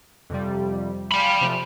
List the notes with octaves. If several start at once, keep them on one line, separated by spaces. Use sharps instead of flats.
F2 C3 G3
F5 G5 G#5 B5 C6
C3 F3 A3